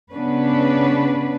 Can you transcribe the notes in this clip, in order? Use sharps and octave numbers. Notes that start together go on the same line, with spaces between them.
C#3 B3 C#4 D4 B4